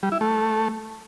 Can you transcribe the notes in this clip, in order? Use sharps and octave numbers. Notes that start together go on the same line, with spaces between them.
G3
E4
A3